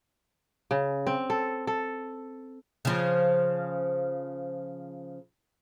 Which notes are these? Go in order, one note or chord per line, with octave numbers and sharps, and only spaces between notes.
C#3
C4
A4
A4
C#3 F3